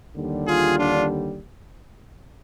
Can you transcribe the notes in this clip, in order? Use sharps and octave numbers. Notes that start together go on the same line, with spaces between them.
D#2 D3 G3
F4 G#4
D4 F4